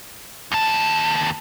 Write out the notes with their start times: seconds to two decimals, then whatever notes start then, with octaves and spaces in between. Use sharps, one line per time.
0.52 D#2 A5